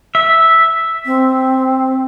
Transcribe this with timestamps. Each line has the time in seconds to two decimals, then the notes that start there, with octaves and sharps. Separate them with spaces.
0.15 E5
1.06 C4